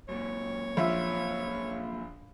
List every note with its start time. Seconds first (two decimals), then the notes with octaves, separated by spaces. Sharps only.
0.09 F#2 A#2 C#5
0.77 A#1 F4 E5